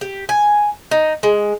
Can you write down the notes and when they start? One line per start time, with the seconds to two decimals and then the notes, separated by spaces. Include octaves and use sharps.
0.01 G4
0.29 G#5
0.91 D#4
1.23 G#3